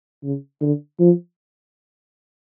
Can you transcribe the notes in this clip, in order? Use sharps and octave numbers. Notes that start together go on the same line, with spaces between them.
C#3
D3
F3